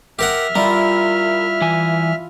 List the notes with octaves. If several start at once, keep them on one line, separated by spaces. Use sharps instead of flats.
G4 A#4 E5 F#5 F6
G3 E4 F4 A#4 G5
E3 G#5